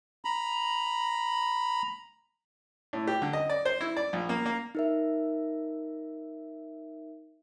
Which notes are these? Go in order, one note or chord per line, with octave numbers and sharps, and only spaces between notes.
A#5 B5
A2
G4
D3
D#5
D5
C5
E4
D5
A#1
A#3
A#3
D#4 A#4 E5